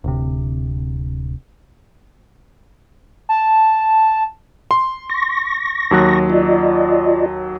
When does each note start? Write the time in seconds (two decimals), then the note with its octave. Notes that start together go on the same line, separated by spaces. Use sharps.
0.04 D1 C3
3.29 A5
4.71 C6
5.10 C#6 A#6
5.91 D#2 F#3 F#6
6.30 F4 D5 D#5